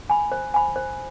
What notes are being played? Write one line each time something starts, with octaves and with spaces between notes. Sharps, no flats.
G#5 B5
C5
G#5 B5
C5